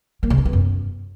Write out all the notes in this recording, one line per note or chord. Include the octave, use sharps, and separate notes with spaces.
A#3
C#3
A#3
B3
F#2